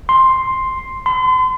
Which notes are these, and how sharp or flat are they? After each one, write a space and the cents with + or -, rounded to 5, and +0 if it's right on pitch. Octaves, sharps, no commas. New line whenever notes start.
C6 +5
C6 -40